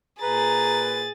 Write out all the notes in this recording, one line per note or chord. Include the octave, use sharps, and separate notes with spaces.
A#2 G#4 B4 A#5 A6